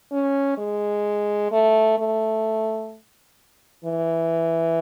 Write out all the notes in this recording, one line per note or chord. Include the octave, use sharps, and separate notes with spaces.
C#4
G#3
A3
A3
E3